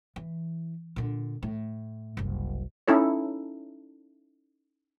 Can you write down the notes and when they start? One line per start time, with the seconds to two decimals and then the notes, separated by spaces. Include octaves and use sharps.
0.16 E3
0.96 A#2 D3
1.43 A2
2.17 F#1 C2
2.88 C#4 D#4 E4 A4 C#5